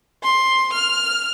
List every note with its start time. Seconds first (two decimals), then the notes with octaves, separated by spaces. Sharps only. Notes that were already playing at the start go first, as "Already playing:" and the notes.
0.24 C6
0.73 F6